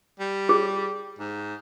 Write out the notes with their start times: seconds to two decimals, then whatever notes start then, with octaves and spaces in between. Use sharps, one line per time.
0.19 G3
0.49 G#4
1.19 G#2